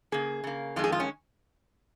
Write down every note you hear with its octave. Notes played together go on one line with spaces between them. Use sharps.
C#3 A#3 G#4
C#3 A#3
F2 D#3 G#3 F4
G#4
F4
C#4